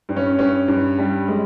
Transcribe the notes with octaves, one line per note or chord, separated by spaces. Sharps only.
G2
C#4
G2 C#4
G2
G3
G#3